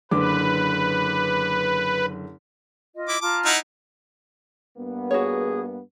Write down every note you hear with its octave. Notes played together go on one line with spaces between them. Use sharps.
F#1 D3 B4 D6
F4 D#5
E4 D6
F4 A5 A#5 D6
D#4 E4 F#5
G2 A#3 B3
F#4 G#4 C#5